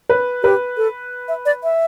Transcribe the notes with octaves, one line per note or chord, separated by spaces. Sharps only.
B4
G4 B4
A4
E5
D5
E5